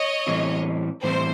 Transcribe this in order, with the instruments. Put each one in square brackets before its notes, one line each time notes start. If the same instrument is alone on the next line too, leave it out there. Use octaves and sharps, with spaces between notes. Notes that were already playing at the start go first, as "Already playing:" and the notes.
Already playing: [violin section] C#5 D#5
[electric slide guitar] A2 E3 G3 C4 E4
[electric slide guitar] A2 E3 G3 C4 E4 [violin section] C5